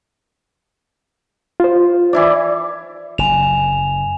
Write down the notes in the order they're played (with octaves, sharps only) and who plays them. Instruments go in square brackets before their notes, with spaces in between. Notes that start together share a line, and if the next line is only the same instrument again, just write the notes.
[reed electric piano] F4 C5
[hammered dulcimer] E3 E4 D5
[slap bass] F#1 [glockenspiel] G#5 E7 F7